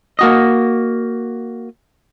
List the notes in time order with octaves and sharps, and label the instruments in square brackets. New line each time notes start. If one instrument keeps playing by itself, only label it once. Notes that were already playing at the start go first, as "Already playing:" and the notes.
[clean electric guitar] A#3 F#4 D#5